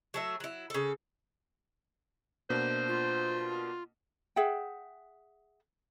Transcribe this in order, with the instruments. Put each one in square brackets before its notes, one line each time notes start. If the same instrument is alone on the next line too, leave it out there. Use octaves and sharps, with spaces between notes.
[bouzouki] F#3 A3 E5
F#3 E4
C#3 A4
[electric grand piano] B2 A#3 D4 [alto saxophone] C5
[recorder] F4
[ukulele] G#4 E5 F#5 G5